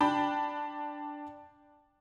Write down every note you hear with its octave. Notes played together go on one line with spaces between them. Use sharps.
D4 G5 B5